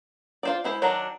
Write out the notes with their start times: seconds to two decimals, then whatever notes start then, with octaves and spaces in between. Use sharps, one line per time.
0.43 F4 C5 D5
0.64 G#3 E4 C5
0.82 D#3 F#3 D4 F#4